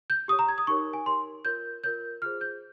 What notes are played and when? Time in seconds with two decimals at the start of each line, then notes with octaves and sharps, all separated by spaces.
0.10 G6
0.28 G4 D#6
0.32 C#5
0.39 A#5
0.48 G#6
0.58 D#6
0.67 D#4 G4 A#4 C#5 C#6
0.93 G#5
1.06 D#4 G4 A#4 C#5 C6
1.45 F4 A#4 C#5 G6
1.84 F4 A#4 C#5 G6
2.22 F4 G#4 C5 F6
2.41 G6